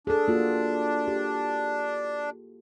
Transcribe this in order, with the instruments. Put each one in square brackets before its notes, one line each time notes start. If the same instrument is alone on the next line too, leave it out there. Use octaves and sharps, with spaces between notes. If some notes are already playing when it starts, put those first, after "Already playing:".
[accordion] D4 [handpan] G#4 A4
[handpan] A#3 F4 F#4
G4